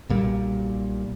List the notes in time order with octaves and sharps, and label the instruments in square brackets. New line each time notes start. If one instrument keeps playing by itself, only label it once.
[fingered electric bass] B1 A#2 G3